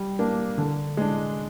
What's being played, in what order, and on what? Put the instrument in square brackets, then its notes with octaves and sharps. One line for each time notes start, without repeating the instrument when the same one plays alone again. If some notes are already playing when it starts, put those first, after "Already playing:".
Already playing: [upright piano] G3
A#3 D4
D3
G#3 D4